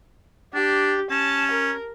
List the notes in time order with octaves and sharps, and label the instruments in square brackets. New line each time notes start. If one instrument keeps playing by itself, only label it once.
[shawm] D4 [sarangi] G4
[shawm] C#4 [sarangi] A5
[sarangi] A#4